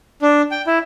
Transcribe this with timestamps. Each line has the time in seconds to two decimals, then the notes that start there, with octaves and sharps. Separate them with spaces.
0.22 D4
0.51 G5
0.67 E4